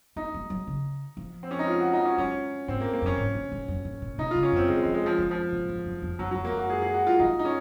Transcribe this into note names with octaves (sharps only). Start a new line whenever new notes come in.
C4 D#4
G#3
F#3
C#3
F3
C4
C#4
D#4
F4
F#4
D#4
C#4
F#3 C#4
G#2 C4
A#3
A#3
F#2 C#4
G#2
A#2
G#2
F#2
G#2
A#2
C3 D#4
C#3 F4
C#4
F#2 C4
D#3 G#3
G#3
F3
G#3
F3
D#3
F3
A#2
G#2
F#2
F2
F#2 F#3
F2 F#3
A#3
F#2
F#4
G#4
G#4
F#4
F4
F#2 D#4
D#4
C#4